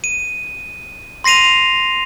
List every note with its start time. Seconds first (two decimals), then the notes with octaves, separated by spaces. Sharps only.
0.04 D#7
1.24 C6 A#6 C7 D#7 F7